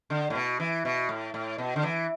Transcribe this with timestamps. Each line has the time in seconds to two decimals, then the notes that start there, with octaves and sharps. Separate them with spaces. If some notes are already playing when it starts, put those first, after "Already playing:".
0.10 D3
0.30 A2
0.35 B2
0.60 E3
0.85 B2
1.09 A2
1.34 A2
1.58 B2
1.76 D3
1.83 E3